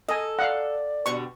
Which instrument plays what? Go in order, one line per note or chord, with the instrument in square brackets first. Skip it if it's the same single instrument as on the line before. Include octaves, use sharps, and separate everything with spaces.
[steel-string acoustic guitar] A4 [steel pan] D#5 G#5
[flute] D5 [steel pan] F5 F#5
[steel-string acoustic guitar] B2 D3 G3 [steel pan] C#6